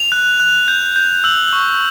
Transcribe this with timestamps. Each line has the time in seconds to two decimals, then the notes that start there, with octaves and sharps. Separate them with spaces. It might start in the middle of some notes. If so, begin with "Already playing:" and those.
Already playing: F7
0.12 F#6
0.40 F#6
0.68 G6
0.96 G6
1.24 E6 F#7
1.53 C#6